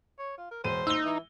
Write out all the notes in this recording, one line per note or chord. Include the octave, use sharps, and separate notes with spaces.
C#5
F4
A#4
E1 C5 D#7
D#4 E6 G7
E3